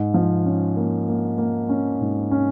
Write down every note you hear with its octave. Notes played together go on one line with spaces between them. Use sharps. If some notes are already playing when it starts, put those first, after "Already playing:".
Already playing: G#2
F3
C#4
A#3
A#3
A#3
C#4
G#2
C#4